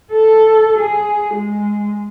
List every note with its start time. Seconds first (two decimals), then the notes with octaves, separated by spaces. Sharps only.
0.12 A4
0.79 G#4
1.35 G#3